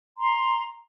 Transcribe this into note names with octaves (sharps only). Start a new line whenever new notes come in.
A#5 C6